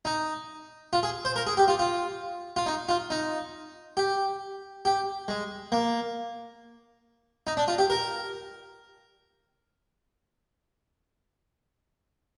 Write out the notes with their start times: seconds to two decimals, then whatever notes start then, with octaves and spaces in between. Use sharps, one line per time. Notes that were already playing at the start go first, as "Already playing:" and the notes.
0.05 D#4
0.93 F4
1.03 G#4
1.25 C5
1.36 A#4
1.47 G#4
1.57 G4
1.68 F4
1.79 F4
2.56 F4
2.66 D#4
2.89 F4
3.10 D#4
3.97 G4
4.85 G4
5.28 G#3
5.72 A#3
7.47 D#4
7.57 D4
7.68 F4
7.78 G4
7.90 A#4